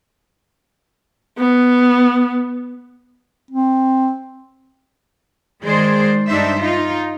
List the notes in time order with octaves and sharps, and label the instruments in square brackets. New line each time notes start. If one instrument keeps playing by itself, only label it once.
[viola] B3
[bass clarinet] C4
[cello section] D#3 G#3 G#4 C5 D5
G2 D4 D#4 C5 E5
D#4 F4